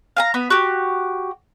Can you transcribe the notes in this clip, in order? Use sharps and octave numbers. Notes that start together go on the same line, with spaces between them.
F5 G#5 A#5
B3 B5
F#4 G4